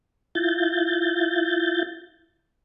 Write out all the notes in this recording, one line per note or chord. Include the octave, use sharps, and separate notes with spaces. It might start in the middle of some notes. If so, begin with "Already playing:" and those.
E4 F4 G6 A6